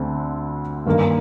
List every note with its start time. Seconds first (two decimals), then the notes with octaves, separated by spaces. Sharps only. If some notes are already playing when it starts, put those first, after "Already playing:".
Already playing: D2 D3 C4
0.86 G2 D#3 A#3